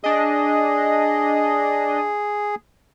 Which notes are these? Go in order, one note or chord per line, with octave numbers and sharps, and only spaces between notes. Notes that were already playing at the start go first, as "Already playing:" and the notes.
D4 G#4 D#5